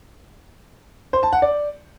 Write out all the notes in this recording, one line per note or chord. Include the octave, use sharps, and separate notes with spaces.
C5
A5
F#5
D5